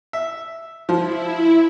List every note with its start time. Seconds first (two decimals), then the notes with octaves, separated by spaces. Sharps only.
0.13 E5
0.89 F3 E4